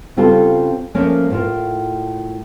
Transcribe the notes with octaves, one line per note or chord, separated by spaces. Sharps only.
C#3 G3 C4 F4 F#4 A4
F3 A3 A#3 C#4 A#4 C#5
A2 F4 A#4